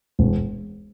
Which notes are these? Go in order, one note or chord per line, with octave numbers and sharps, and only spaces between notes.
E1